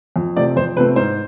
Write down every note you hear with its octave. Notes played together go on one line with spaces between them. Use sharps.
F2
C3 F3 A3 C4 D5
F2 C5
C3 F3 A3 C4 B4
G#2 C5